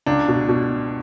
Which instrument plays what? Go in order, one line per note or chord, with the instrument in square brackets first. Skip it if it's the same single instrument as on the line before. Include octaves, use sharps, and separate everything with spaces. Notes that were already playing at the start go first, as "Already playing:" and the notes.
[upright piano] C#2 [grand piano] D4
[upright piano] B2
B2